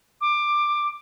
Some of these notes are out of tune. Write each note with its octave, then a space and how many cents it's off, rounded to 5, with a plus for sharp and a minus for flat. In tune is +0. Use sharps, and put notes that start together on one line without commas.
D6 +15